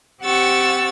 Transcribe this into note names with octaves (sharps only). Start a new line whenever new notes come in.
C4 G4 F#5 C#6 E6 A6